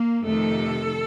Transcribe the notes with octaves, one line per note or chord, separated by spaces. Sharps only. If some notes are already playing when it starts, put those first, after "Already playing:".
Already playing: A#3
F2 C3 D#3 A3 A4